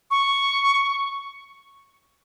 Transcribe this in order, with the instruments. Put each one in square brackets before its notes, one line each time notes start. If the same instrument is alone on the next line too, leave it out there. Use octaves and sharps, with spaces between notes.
[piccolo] C#6